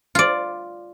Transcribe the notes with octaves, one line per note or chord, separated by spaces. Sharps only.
F4 D5